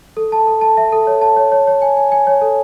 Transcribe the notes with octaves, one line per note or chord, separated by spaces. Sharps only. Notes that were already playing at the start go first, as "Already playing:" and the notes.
A4
A5
A4
A5
E5
A4
C#5
A5
C#5
C#5
C#5
G#5
G#5
G#5
C#5
A4